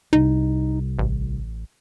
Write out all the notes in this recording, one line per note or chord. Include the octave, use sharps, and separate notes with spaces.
C2 D#4
A1